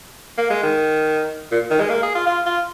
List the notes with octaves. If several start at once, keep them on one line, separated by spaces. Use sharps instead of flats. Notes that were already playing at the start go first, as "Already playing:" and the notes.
A#3
G#3
D#3
A#2
D#3
G#3
A#3
G#4
F4
F4
F4